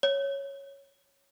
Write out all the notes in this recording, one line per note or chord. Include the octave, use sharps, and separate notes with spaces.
C#5